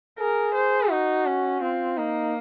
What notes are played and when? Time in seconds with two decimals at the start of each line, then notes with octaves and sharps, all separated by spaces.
0.19 G#4 A#4
0.54 C5
0.89 D#4 F#4
1.26 C#4
1.61 C4 F4
1.97 A#3 D#4